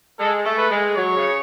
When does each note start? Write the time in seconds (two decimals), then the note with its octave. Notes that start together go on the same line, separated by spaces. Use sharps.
0.19 G#3 A4
0.45 A3
0.57 B4
0.70 G#3
0.96 F#3 C#5
1.16 C#3